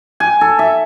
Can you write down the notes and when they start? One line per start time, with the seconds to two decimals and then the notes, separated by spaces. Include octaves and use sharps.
0.20 G#5
0.41 A4
0.59 E5